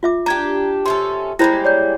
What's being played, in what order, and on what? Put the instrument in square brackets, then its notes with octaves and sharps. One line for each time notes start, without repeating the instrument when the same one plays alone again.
[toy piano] F4 E5 D6
[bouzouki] D4 G4 [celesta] A#5 G#6
[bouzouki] C3 C#4 A4 [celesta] C6
[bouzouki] G3 G#3 A#3 [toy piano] E4 C5 B5 [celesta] A#6
[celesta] C#5 D5 G6